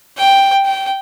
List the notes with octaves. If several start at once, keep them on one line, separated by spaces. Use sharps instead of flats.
G5
G5